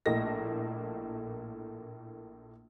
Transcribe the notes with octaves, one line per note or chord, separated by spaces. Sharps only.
A#1 A2 A3 A#3 D#5 A#6